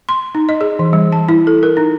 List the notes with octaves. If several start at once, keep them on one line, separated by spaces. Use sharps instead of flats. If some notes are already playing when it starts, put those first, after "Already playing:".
C6
D#4
D#5
G#4
E3
G3
A5
E4
A4
A#4
D#4